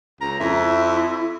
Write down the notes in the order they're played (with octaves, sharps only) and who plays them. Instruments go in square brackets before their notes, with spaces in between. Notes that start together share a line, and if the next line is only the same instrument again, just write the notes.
[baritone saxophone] C#2 [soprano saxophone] A#5
[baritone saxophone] F2 [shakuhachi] E4 [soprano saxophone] E5